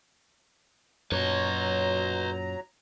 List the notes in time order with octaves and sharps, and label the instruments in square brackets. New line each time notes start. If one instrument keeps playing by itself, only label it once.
[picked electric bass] F#2 A#2 [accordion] F#3 A#5 [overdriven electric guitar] B4 C#5